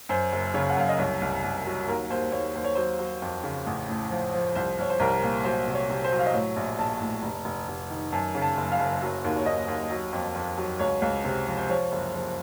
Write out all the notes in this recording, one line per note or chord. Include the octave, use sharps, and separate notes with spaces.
F#2 C5
F#1
C#3 C#5
F#5
F#2 F5
D#5
C2 C#5
C2
C2
F#3
D#2 A#4
D#2 C5
D#2 C#5
D#2 C5
C#5
F#3 C5
F#3
F2
C#3
A1
A2
F3
F3
C2 C5
C2 C#5
C5
C2 A#4
A#2
F#3 C5
C3
C#5
C3
C5
F#3
F5
D#5
A2 C#5
A#1
A#1 A5
A2
F1
F1
F1
D#3
F#2 A5
C#3
A5
F#1
F5
F#1
F#3
D#2
C#5
D#2 D#5
D#2
F#3
F2
F2
F#3
C#2 C#5
C#2
C3
F3
C5
F3 C#5
F#1
F3